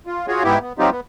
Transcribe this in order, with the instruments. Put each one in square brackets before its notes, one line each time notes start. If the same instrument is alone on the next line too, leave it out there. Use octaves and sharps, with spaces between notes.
[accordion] F4
F4 F#4 G#4 C#5
G#2 B3 E4 G4
B3
F#3 C4 D#4 F4 G4
B3